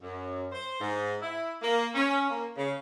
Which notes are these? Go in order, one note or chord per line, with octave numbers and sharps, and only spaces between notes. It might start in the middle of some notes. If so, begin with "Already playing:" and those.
F#2
C5
G#2
E4
A#3
C#4
A#3
C#3